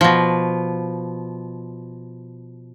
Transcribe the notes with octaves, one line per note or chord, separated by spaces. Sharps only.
B2 F3